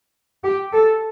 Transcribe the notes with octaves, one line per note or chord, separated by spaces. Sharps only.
G4
A4